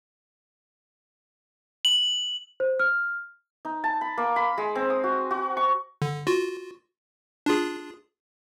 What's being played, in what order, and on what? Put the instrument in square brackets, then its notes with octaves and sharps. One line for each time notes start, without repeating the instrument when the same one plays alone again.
[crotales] F#7
[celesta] C5
F6
[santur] D#4
A5
B5
A#3
B5
G#3
C4
D#6
F#4
F#4
C#6
[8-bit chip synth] D3
F4 F#4
D4 F4 G#4